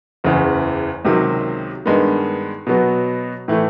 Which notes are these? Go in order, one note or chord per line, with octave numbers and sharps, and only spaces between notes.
F#1 E2 C#3 E3
C#2 C3 D#3 F#3
G2 D#3 G#3 B3
B2 F#3 B3
A2 E3 A3